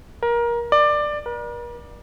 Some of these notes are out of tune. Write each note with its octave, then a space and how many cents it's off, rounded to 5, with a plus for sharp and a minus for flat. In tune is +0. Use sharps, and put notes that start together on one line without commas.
A#4 +20
D5 +15
A#4 +45